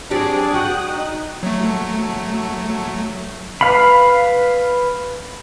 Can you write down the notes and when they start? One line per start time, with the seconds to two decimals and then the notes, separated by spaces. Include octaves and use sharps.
0.11 F#3 C4 D4 G4 G#4 D5
0.54 F#4 G5 D#6 F#6
0.87 D#4
1.43 F#3 A3
3.61 B4 F5 B5